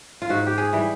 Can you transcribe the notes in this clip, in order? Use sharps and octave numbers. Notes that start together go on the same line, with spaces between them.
F4
G#2 F#4
G4
G#4
E3 G3